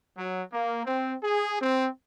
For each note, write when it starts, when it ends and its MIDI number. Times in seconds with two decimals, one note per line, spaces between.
0.17 0.42 54
0.53 0.83 58
0.86 1.15 60
1.23 1.59 68
1.61 1.88 60